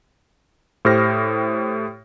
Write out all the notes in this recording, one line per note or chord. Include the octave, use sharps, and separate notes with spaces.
A2 G4 C5 F6 A#6